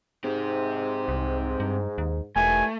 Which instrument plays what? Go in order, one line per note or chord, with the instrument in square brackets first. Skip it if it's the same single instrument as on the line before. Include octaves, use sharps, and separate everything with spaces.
[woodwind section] G#2 [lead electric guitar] C4 G4
[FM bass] C2
G2
D#2
[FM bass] E1 [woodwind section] D#3 E3 G3 [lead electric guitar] A3 [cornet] G#5